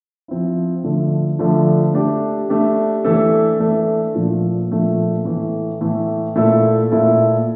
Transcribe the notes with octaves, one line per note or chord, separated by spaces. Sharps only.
F3 C4 E4
D3 F3 A3 D4
D3 F3 A3 D4
A3 D4 G4
A3 D4 G4
E3 A3 D4 A4
E3 A3 D4 A4
A#2 F3 A3 D4
A#2 F3 A3 D4
A2 E3 A3
A2 E3 A3
A#2 A3 E4 A4
A#2 A3 E4 A4